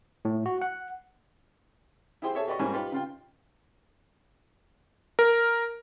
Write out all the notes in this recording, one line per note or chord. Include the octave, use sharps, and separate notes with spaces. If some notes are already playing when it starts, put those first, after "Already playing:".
A2
F#4
F#5
E4 G4 G#4 C5 G5
G#4 A4 C#5 E5
F#4 G4 B4 D5 D#5 C#6
G#2 G3 A#3 C#4 E4 G#5
D#4 F4 G4 B4
C#3 F4 G5
A#4